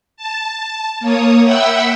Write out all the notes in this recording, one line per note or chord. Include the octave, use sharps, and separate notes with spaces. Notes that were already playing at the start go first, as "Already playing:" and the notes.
A5
A#3 C#5 D#6
E5 F#5 G5 B5 E6